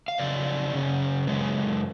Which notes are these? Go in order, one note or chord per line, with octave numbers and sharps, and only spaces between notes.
F5
F2 C#3 F#3 D5
F#2 C#3 C#4
F#2 C#3 G#3 C#4